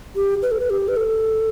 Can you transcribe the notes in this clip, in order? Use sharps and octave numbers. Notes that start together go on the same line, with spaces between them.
G4
B4
A4
B4
G4
B4
A4